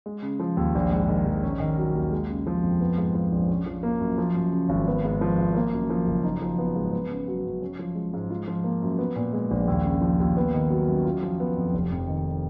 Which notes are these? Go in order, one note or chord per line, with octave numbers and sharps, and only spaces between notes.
G#3
C#3
F3
D#2
A#1
G#2
D#3
A#1
C#4
D#3
F#3
D#2
G#3
C#3
F3
F2
B3
G#2
F3
A#1
C#4
F3
A#3
F#2
F3
F#2
C#3
G#1
B3
G#2
F3
G#1
A#3
F#2
F3
F#1
D#4
F3
B3
G#2
B3
C#3
F#3
F#2
C#4
F3
G#3
G#2
F4
F3
A#3
F#2
B3
A#2
G#3
A#1
D#2
C#3
F3
D#2
B3
D#3
F#3
F#2
F4
F3
B3
F2
F1
F2
D#3